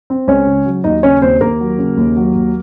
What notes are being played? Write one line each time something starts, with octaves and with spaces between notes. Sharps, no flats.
C4
C#2 C#4 C#5
C#3
F#3
D#2 D#4 D#5
C#3 C#4 C#5
D#2 C4 C5
D#2 A#3 A#4
F#3
C#3
D#2
F#3
D#2